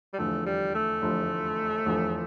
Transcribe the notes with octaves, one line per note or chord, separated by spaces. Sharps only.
G3
F1 E2 D3 F3 A3
G3
A3
F1 E2 D3 F3
F1 E2 D3 F3